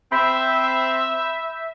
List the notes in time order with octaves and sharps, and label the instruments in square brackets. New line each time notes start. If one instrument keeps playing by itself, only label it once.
[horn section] C4 [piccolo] E5 [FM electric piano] B5 G6 B6